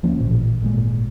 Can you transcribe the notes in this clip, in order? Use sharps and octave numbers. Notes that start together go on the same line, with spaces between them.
D2 F3 A#3 C#4
A1 A#2
G#1 A#2 G#3